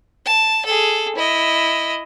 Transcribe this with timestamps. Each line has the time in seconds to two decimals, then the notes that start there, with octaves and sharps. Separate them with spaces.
0.25 A5
0.66 G#4 A4
1.15 E4 D#5